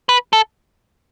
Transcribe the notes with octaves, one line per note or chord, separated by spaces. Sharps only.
B4
A4